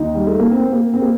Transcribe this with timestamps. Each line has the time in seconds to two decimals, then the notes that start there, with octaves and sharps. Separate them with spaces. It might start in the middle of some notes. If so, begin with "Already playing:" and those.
Already playing: D#2 D#3 D#4
0.15 G3
0.27 A3
0.39 A#3
0.51 C4
0.72 A#3
0.94 C4
1.02 A#3